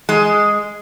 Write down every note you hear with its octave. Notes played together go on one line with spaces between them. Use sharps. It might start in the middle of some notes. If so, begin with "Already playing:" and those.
G#3